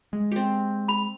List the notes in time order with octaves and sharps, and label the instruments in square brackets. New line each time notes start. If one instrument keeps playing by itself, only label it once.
[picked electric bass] G#3
[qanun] C4 G4
[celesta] B5 F7